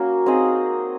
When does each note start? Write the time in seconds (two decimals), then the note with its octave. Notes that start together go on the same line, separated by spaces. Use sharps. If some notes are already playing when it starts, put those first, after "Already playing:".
Already playing: A#3 C#4 F#4
0.26 C4 D#4 G#4 D#5